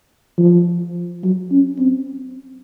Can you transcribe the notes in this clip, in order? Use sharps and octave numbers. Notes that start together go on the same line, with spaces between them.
F3
F#3
C#4
C4